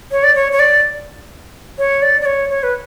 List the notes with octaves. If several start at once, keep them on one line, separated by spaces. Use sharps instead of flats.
C#5
D5
C#5
C#5
D5
C#5
D5
D5
C#5
C#5
B4